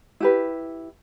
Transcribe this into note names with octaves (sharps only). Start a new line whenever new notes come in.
E4 G4 B4